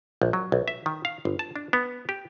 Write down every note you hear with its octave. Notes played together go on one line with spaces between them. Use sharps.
A#1
F#3
B1
E5
D#3
F5
G1
A5
D4
B3
G4